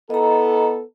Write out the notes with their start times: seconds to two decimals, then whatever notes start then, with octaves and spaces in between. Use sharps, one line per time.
0.10 B3 E4 A4 D#5 A#5